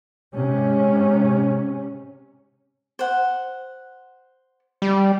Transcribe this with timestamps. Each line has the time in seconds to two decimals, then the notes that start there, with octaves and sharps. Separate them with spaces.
0.34 G#2 C3 C#4
2.99 C5 F#5
4.82 G3